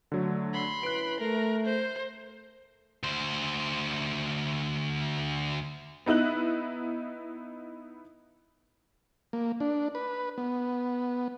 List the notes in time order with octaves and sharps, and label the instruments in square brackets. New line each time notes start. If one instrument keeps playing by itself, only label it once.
[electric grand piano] D3 F#3 A3
[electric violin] B5 C6
[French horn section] C#4 E4 B4 [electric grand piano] F#6 D7
[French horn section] A3 [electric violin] A#4
[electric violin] C5
[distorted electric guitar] D2 C5
[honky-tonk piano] B3 D#4 E4 F#6 F#7
[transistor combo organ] A#3
D4
B4
B3